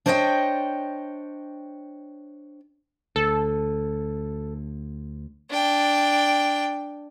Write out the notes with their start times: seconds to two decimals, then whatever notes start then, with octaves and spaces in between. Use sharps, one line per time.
0.06 D4 C5 C#5 D#5 F5 G5
3.16 D2 A4
5.50 D4 G5